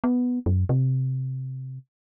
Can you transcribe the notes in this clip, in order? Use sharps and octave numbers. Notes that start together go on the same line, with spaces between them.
B3
F#2
C3